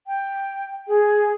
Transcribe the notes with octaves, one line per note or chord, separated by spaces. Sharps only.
G5
G#4